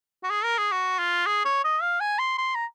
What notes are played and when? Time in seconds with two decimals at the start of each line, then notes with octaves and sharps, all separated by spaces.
0.23 F#4
0.30 G#4
0.44 A#4
0.58 G#4
0.72 F#4
0.99 F4
1.26 G#4
1.45 C#5
1.64 D#5
1.82 F5
2.00 G#5
2.19 C6
2.38 C6
2.55 A#5